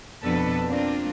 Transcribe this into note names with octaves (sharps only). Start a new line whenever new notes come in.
F2 B2 D4 A4 B4
A#3 C4 D4 F4